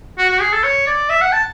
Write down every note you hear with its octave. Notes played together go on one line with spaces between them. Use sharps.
F#4
F#4
G#4
A4
C#5
D5
E5
F#5
A5